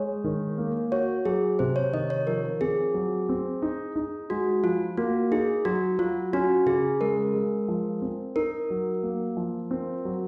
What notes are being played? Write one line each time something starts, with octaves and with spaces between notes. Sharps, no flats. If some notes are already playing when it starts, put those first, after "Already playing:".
Already playing: G#3 C#5
D#3
A#3
F#4 C#5
F#3 G#4
C3 C5
C#5
D#3 D#5
C#5
F3 A#4
C4 G#4
F#3
C4
D#4
D#4
G#3 F#4
F3 F4
A#3 F#4
D#4 G#4
F#3 F#4
F#3 F4
C#4 F#4
C#3 G#4
G#3 A#4
G#3
F3
C4
D#4 A#4
F#3
A#3
F3
C4
F#3